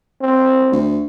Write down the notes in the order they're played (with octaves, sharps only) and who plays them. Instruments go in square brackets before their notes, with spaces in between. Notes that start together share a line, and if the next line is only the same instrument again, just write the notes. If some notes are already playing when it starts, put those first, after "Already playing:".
[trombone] C4
[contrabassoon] D2